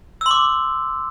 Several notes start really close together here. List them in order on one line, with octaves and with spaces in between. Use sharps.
E6 C6 D6